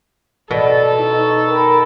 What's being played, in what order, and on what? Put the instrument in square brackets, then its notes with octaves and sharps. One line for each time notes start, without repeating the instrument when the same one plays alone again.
[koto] B2 [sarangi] A4 [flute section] D5
[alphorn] D#4 [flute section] C#6 D#6 E6
[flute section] A#4 G5 B5